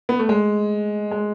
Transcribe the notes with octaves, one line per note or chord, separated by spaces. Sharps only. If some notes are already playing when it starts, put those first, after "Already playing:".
B3
A3
G#3
G#3